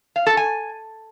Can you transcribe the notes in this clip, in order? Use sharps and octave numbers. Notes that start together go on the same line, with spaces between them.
F5
A4
G#5